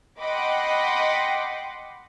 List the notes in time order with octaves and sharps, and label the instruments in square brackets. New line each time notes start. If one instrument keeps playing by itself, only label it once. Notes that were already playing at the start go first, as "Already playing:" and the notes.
[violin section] D#5 F#5 G5 B5 C6 D6